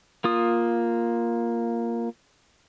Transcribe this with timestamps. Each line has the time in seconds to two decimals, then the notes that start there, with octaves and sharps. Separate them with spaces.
0.24 A#3 F4 D#6